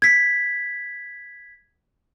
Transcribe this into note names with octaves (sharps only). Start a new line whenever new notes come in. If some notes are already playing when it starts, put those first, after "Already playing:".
G#6 B6